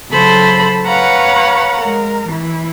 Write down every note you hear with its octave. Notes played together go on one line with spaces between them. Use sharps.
C#3 F#3 A4 C5 B5 C6
B4 C#5 F5 F#5 A#5
G#3 A#4
E3 E4